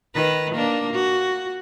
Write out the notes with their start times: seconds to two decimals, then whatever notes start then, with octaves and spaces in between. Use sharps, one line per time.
0.14 D#3 B4
0.54 A#3 D4
0.93 F#4